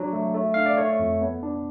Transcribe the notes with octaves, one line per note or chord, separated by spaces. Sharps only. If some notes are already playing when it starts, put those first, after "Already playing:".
Already playing: F#3 D4
A3
A3
D4 F5
D5
A3 C#5
F2
B3
D4